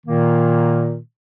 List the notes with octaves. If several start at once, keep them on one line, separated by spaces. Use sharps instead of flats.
A#2 D#3 A#3